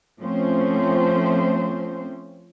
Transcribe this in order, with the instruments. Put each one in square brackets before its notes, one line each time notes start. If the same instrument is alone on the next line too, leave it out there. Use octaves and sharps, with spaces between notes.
[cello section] F3 A3 C4 C#4 C5